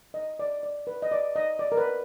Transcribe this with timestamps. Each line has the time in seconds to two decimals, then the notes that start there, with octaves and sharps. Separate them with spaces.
0.14 D#5
0.39 D5
0.63 D5
0.87 B4
1.02 D#5
1.12 D5
1.36 D#5
1.59 D5
1.72 A#4
1.78 B4